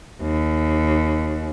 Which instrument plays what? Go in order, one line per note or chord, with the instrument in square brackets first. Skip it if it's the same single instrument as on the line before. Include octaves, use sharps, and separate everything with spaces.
[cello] D#2